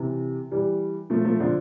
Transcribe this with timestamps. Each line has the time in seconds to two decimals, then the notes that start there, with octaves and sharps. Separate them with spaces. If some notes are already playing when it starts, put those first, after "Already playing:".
Already playing: C3 E3
0.51 E3 G3
1.10 F3 A3
1.25 F3 A3
1.40 D3 F3